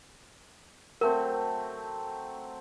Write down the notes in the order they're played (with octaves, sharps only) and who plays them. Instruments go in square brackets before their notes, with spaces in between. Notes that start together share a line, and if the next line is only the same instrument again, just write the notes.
[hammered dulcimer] F#3 A3 C4 [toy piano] A#4